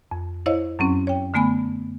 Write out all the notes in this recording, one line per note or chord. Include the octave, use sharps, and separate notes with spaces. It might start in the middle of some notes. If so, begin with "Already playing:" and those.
F2
E4 C5 C#5 D#5 F5
F#2 F#3 C4 C#4
C#5 G5
D3 A3 B3 G#5 B5